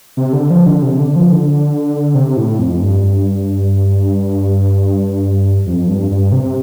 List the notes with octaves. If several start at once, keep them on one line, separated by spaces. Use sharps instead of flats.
C3
D3
F3
D3
C3
D3
F3
D3
C3
A2
F2
G2
F2
G2
G2
C3